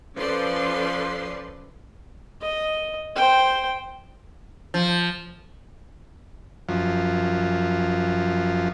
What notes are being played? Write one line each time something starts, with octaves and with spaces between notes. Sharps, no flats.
F3 C#4 A4 B4 D5 C6
D#5
C5 G5
F3
F#2 F3